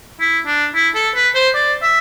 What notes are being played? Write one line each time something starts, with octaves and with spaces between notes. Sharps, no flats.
E4
D4
E4
A4
B4
C5
D5
E5